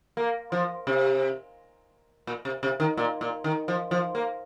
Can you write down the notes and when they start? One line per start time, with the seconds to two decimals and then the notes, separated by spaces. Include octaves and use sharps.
0.17 A#3
0.52 F3
0.87 C3
2.27 A#2
2.45 C3
2.63 C3
2.80 D#3
2.97 A#2
3.21 A#2
3.44 D#3
3.68 F3
3.91 F3
4.15 A#3